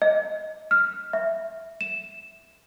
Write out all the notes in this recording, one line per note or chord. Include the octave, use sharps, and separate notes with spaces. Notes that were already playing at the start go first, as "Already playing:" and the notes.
D#5
F6
E5
E7